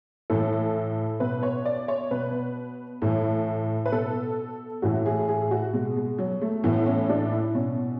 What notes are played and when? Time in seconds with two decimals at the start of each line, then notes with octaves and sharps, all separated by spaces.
0.30 A2 E3 A4
1.20 B2 B4
1.43 C#5
1.65 D5
1.88 C#5
2.11 B2 B4
3.02 A2 E3
3.86 B4
3.92 B2 A4
4.82 A2 E3 F#4
5.06 G#4
5.28 G#4
5.51 F#4
5.73 B2 G#3
5.96 G#3
6.18 F#3
6.42 A3
6.64 A2 E3 B3
6.86 C#4
7.09 D4
7.32 E4
7.54 B2 C#4